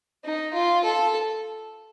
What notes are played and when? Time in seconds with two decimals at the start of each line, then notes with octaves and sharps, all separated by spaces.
0.24 D#4
0.54 F4
0.84 A4